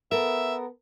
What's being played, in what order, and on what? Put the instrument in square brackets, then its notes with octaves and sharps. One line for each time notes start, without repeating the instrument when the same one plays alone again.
[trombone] B3 [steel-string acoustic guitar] A4 A#4 [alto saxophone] E5